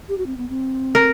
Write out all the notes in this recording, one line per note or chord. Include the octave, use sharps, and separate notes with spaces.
G4
F#4
C4
B3
C4
A#4